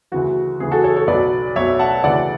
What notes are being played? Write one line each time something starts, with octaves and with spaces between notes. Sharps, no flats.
D2 C#3 E3 F#4
D2 C#3 E3 G#4
F#4 A4
A4 C#5
A4 C#5
B1 B2 F#3 B4 D5
B1 B2 F#3 C#5 E5
F#5 A5
D2 C#3 E3 D5 F#5